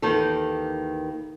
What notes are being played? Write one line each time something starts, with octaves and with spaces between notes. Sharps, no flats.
D#2 D#3 E3 A4